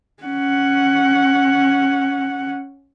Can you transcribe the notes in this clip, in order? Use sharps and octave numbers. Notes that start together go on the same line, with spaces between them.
C#4 F#5